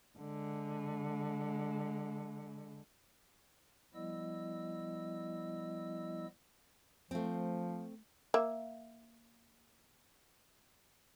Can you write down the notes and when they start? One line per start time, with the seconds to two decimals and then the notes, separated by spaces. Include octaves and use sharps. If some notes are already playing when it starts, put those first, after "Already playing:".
0.19 D3 G#3
3.94 F3 G3 B3 E4 D#5 E6
7.11 F3 A3 C4
8.34 A#3 E5